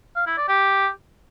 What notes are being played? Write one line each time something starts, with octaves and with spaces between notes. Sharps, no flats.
F5
E4
D5
G4